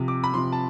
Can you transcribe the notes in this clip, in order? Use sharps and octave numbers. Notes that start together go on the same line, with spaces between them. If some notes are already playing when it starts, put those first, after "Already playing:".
Already playing: C3 F3
D6
B5
C3 F3 C6
A5